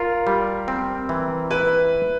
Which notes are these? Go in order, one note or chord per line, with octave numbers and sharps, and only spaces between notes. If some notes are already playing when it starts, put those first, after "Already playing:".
Already playing: F4 A#4
G3
C4
E3
E4 B4